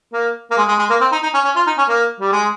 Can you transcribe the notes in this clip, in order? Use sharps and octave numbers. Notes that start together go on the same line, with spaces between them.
A#3
A#3
G#3
G#3
G#3
A#3
C4
D#4
D#4
C#4
C#4
F4
D#4
C#4
A#3
G3
G#3